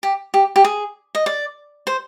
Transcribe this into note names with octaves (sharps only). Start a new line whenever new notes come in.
G4
G4
G4
G#4
D#5
D5
C5